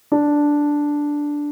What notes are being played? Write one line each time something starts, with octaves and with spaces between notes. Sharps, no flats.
D4